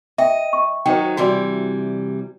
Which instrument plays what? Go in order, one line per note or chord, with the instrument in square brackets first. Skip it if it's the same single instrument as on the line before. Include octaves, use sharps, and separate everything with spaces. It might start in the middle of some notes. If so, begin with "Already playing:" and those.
[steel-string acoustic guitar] D#5 [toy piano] E5 G5
[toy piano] C#6
[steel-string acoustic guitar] D#3 F#3 D#4 [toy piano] C5 G5
[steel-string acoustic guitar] C3 E3 G3 [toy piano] F#4 D5